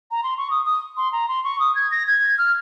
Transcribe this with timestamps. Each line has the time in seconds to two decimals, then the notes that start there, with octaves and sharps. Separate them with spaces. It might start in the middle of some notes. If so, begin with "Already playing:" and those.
0.11 A#5
0.24 C6
0.38 C#6
0.51 D#6
0.65 D#6
0.97 C6
1.12 A#5
1.29 C6
1.44 C#6
1.60 D#6
1.75 G#6
1.91 A#6
2.07 G#6
2.38 F6